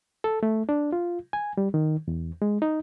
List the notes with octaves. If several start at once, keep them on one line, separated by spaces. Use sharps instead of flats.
A4
A3
D4
F4
G#5
G3
D#3
E2
G#3
D#4